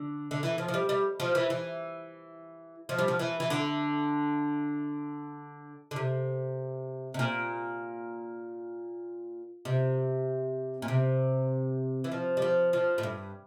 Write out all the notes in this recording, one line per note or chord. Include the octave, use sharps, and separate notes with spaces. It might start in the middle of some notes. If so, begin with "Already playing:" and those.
Already playing: D3
D3
E3
F3
F3
G3
G3
F3
E3
E3
F3
G3
F3
E3
E3
D3
D3
C3
C3
A#2
C3
A#2
C3
E3
F3
G3
F3
F3
A2
G2